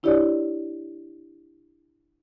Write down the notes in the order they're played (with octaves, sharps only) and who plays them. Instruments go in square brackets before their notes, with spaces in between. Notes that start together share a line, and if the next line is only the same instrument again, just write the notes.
[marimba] D4 E4 G4 C#5 D5